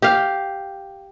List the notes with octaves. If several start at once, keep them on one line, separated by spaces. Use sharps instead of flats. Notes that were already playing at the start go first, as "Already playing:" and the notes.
G4 F5